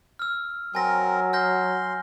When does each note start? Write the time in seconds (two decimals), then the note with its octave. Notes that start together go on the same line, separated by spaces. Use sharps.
0.19 E6 F6
0.75 F#3 C4 A#4 G#5 A#6
1.33 C6 F6 G6 A#6